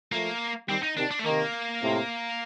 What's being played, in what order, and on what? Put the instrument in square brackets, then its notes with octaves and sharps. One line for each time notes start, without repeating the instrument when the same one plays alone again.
[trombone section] F3 A3 [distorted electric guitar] A#3
[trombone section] D#3 G3 [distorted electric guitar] C4
[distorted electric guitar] D#4
[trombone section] C3 D#3 [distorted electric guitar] D4
[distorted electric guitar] D4
A3
[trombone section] C3 D#3 [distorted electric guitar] A#3
[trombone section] A2 C3